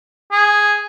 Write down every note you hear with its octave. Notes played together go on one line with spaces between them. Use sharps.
G#4